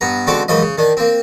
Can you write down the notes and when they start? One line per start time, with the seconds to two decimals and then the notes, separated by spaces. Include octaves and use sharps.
0.01 G2 B3 A#5
0.27 C#2 D3 C4 F#4 C5 D6
0.48 C#2 F#2 E3 F3 D#5
0.62 C#3
0.78 D#3 D4
0.97 A#3 C4